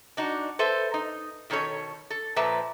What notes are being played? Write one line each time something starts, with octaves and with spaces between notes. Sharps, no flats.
D4 D#4 F#4
A4 B4 C5 E5
D#4
B2 D#3 C#4 A4 C#5
A4
A#2 F3 B4 E5 A5 A#5